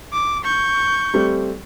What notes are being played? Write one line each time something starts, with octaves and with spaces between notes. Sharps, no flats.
D6
C#6 G6
G3 A3 C4